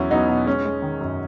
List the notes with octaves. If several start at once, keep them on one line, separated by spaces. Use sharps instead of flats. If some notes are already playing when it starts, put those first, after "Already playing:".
Already playing: E2 F#3 C#4 E4
F#3 B3 D#4
B2
G#3 C#4
G#3
D#3
F#2